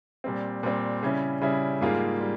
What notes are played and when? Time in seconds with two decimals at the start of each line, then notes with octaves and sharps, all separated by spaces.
0.24 A#2 G3 C4
0.63 A#2 G3 C4
1.03 C#3 G3 C#4 E4
1.41 C#3 G3 C#4 E4
1.81 G#2 G3 A#3 F4 G#4
2.21 G3